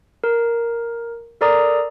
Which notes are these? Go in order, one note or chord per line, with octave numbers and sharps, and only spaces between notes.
A#4
A4 A#4 D5 A#5 D#6